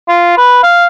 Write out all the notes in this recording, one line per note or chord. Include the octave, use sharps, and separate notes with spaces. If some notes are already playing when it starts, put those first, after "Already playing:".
F4
B4
F5